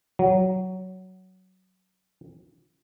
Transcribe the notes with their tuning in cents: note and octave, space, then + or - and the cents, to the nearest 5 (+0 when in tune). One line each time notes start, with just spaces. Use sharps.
F#3 +10